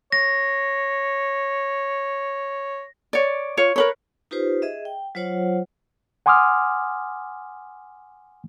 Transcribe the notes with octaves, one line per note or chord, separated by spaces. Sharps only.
C#5 A#6
C#5 D5
F4 C#5
A#4 B4 C#5
D#4 F4 G4 B4 C5
G#4 D#5 E5
G5
F#3 F4 C5 C#5 F#5
F#5 G#5 C6 D6 D#6 F6